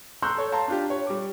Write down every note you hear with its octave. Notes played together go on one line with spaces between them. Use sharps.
A#5 C6 C#6 E6 F#6 G6
A4 C#5
F5 A5 A#5 C6
D4 F4 G4
C#5
G3 D6